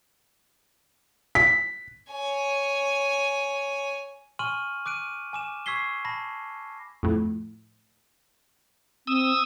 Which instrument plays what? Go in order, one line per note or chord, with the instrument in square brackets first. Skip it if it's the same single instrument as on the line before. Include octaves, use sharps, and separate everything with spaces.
[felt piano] B6
[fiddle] C#5 G#5
[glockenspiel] G#5 C6 C#6 F6 D#7 F#7
D6 F#6 D7 D#7
G#5 D6 E7
C#6 E6 G#6 B6 C7 G7
A5 B5 A#6
[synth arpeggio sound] F2 A2
[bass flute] C4 [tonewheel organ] D#6 E6